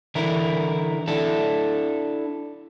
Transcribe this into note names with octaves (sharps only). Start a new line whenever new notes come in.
D3 E3 E4 A#4
D4 E4 A4